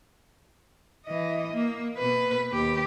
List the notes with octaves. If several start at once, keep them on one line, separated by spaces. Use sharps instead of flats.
E3 D#5
A#3
B2 B4
D#2 G4